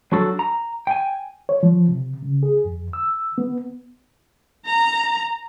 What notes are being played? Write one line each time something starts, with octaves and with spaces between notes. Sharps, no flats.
F#3 D4 F#4 A4
A#5
G5 G#5
C#5
F3
C3
C#3
G#4
F2
E6
B3
A#5